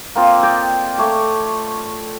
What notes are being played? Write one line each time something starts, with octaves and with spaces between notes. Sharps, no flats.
A#3 C4 F4
D5 D#5 G5
A3 C#5 D6